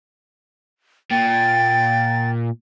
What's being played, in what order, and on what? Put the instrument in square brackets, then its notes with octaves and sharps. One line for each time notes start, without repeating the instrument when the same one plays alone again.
[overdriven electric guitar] A#2 [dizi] G5 [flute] A6